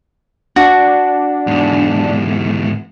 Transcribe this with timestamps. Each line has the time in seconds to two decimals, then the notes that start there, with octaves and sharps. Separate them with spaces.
0.56 D4 F#4
1.47 E2 G#2